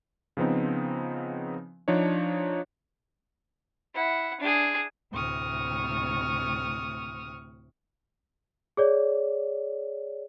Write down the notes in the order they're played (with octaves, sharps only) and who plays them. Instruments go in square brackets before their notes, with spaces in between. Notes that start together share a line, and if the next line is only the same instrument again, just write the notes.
[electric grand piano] C#3 F3 B3 C4 D#4
F3 D4 D#4 C#5
[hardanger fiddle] E4 F#5
D4 G#4
[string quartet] D2 A2 C3 C#6 D#6 F6
[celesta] G#4 C#5 D5